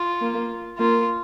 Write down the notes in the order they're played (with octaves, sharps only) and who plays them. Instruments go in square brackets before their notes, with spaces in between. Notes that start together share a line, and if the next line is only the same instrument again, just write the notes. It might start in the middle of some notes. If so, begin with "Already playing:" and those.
Already playing: [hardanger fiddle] F4
[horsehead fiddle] A#3
[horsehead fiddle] A#3 [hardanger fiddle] F4